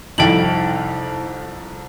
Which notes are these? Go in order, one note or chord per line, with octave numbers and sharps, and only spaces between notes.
C2 F2 D#4 E4 A4 G5 A5 F#7